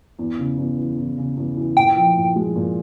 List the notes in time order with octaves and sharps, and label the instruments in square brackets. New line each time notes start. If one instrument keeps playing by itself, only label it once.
[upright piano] E2
C#3
E2
E3
E2
C#3
E2
E3
[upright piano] A#2 [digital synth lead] G5
[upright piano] F3
A#2
G#3
A#2